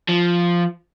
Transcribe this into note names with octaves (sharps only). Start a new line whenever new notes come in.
F3